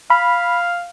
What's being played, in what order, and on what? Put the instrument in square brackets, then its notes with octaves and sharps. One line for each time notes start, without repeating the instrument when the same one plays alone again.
[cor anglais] F5 [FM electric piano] B5